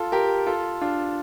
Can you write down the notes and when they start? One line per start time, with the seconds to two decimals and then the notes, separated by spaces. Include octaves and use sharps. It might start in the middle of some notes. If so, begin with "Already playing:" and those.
Already playing: F4 A4
0.12 G4 A#4
0.46 F4 A4
0.81 D4 F4